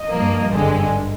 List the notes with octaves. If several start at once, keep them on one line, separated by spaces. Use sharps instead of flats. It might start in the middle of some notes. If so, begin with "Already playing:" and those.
Already playing: D#5
G2 F3 A#3
G#1 G2 D3 G#3